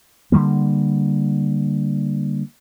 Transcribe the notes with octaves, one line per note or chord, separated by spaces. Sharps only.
D3 E3 G3 A#3